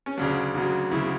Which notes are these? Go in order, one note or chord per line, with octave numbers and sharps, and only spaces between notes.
C#4
D2 C#3 F#3 D4
D2 C#3 F#3
D2 C#3 F#3 E4